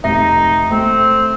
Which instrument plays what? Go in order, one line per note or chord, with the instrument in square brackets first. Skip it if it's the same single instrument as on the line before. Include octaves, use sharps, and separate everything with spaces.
[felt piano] F1 A#6 [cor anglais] D#4 [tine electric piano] E5
[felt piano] A3 [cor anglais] C4